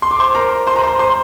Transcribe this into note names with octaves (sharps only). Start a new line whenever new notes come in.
C6
D6
C5 C6
A#4 A#5
C5 C6
A#5
C5 C6
C5 C6